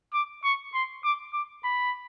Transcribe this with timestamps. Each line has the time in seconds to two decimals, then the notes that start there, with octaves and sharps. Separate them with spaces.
0.14 D6
0.44 C#6
0.74 C6
1.04 D6
1.33 D6
1.65 B5